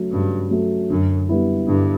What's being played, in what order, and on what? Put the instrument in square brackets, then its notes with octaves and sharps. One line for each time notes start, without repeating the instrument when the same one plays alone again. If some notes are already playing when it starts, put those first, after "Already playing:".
Already playing: [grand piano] C#3 F#3 A3
[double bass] G2 [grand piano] C#3
[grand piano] F#3 A3
[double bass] F#2 [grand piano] D3
[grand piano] G3 B3 E4
[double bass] G2 [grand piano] D3